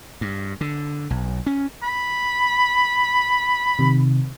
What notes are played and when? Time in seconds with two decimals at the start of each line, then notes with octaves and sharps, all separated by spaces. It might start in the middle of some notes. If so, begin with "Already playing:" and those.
0.21 G2
0.61 D3
1.10 B1
1.46 C#4
1.83 B5
3.79 C3 D#3